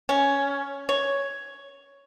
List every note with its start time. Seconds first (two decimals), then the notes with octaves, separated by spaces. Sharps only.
0.09 C#4
0.89 C#5